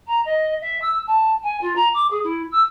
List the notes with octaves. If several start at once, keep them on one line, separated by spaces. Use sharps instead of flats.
A#5
D#5
E5
E6
A5
G#5
F4
A#5
D6
G#4
E4
E6